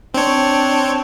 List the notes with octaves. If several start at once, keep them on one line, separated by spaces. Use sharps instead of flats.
C4 D4 C#5